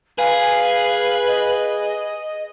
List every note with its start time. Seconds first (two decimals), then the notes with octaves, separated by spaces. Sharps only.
0.18 G#4 B4 F5
1.28 D#5